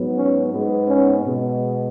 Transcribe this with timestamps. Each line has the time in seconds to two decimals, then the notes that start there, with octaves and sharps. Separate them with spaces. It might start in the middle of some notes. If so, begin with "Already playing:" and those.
Already playing: G#2 F#3 B3
0.16 C#4
0.53 G#2 G#3 B3
0.88 C#4
1.25 B2 G#3 B3